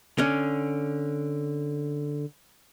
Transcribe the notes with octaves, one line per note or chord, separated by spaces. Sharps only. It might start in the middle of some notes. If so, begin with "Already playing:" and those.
D3 C#4